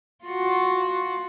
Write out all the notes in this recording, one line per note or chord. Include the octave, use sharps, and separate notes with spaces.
F4 F#4